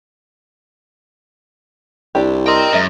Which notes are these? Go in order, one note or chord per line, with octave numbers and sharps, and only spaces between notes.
C2 D4 E4 G4
A#4 D#5 G5 C6
F#2 G#3 E5